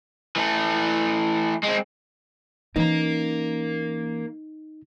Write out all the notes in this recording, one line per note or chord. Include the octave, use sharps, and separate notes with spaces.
E3 A3
G#3 C4
E3 A#3 C#4 D#4 A#4